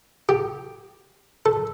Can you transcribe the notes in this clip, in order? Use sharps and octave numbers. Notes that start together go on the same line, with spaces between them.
G4
A4